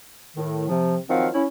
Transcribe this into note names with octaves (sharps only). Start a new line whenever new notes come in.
A2 D#3
C3 F3
D#3 F3 F#3 C4 F5 F#5
C#4 E4